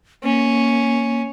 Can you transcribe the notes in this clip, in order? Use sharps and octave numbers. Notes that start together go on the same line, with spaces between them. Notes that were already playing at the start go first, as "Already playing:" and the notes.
A#3 C#4